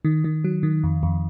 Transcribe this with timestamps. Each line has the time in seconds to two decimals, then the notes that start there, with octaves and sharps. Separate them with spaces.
0.05 D#3
0.24 D#3
0.44 F#3
0.63 D#3
0.84 F2
1.03 F2